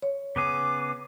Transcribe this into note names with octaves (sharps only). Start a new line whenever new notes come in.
C#5
C#3 B3 G#4 D6